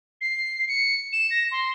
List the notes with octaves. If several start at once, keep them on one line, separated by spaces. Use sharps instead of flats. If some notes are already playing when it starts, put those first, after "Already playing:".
C7
C#7
E7
A#6
C6